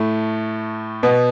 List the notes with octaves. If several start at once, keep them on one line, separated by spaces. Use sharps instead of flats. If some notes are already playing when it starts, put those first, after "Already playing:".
Already playing: A2 A3
B2 B3